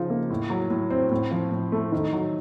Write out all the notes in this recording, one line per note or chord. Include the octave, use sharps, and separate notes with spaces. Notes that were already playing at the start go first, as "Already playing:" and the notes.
Already playing: C#3 F3 D#4 F4
A#3
A2
F#3
A2
C4
A2
F3
A2
A3
D#3
F#3